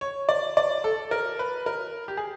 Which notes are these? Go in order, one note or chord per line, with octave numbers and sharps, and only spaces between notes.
C#5
D5
D5
A4
A#4
B4
A#4
G4
G#4